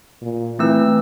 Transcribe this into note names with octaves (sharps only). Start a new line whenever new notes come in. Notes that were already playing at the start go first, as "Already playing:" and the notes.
A#2
E3 A3 C4 E6